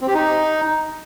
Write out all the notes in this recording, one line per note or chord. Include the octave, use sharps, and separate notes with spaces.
C4
G4
D#4